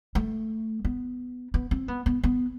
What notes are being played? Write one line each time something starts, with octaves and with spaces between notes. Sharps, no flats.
A3
B3
B3
C4
B3
B3
B3